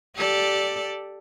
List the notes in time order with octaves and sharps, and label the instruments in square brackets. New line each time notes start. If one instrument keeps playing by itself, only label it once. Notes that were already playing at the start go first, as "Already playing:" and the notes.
[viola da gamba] G4 A4 D5